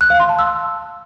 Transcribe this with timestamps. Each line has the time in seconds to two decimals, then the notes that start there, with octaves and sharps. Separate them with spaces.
0.01 F#6
0.10 F5
0.20 C6
0.29 A5
0.39 E6